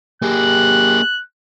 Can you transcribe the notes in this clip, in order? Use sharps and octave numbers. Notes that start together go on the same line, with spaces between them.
A#3 G4 G#4 F#6